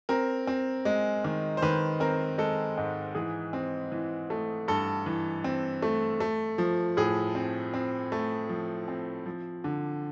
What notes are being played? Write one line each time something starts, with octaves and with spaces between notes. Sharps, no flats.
C4 A#4
C4
G#3
D#3
C5
D#3 B4
C4 A#4
G#3 A4
G#2
E3 G#4
C4
E3
A3
G2 A4
E3
C4
A3
A3
F3
A2 G#4
C4
C4
A3
F3
C4
F3
D3